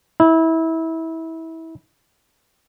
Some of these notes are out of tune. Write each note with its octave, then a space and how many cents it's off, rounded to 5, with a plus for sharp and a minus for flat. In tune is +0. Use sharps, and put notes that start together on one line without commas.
E4 -25